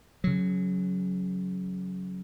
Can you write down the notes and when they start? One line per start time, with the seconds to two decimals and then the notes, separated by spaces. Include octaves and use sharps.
0.24 C#3 F#3